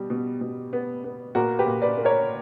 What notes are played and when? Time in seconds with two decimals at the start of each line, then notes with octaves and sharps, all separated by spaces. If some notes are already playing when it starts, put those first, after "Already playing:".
Already playing: B2 G3
0.10 B2
0.41 B2
0.73 B3
1.04 B3
1.35 A#2 F#4 A#4
1.59 G4 B4
1.67 A#2
1.82 B4 D5
1.97 A#3
2.05 A#4 C#5